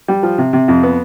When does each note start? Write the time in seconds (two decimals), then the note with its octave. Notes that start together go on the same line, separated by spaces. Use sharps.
0.08 G3
0.23 F3
0.38 C3
0.53 C3
0.68 F2
0.83 B3